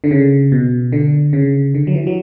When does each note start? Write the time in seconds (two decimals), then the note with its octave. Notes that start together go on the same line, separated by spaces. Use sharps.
0.04 D3
0.11 C#3
0.52 B2
0.92 D3
1.33 C#3
1.74 D3
1.87 F#3
1.94 E3
2.07 F#3